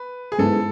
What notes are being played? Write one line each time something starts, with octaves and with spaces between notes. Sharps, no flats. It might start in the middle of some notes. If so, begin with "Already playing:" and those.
Already playing: B4
G#4
G#2 G#3 B3 E4 A4